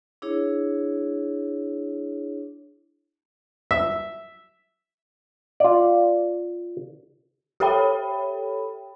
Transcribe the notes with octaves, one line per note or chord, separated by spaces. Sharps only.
D4 E4 G#4 C#5
E5
F4 D5
G4 A4 C#5 E5 G5 B5